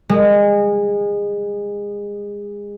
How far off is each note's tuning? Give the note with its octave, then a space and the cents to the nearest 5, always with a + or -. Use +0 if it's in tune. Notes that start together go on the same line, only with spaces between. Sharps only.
G#3 -25